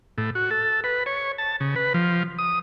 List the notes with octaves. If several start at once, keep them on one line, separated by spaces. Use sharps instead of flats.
A2
F#4
A4
B4
C#5
A5
C#3
B4
F3
D#6